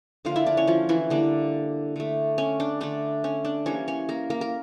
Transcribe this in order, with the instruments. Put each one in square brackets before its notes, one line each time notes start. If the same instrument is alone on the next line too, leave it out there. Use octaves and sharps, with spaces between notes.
[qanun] D3 F3 A#3 F4 F5
E4 E5
D4 D5
C#4 C#5
F3 F4
E3 E4
D3 G3 A#3 D4
D3 A3
C#4
D4
D3 A3 D4
C#4
D4
E3 G3 A#3 C#4 C#5
C#4 C#5
A#3 A#4
A#3 A#4
A#4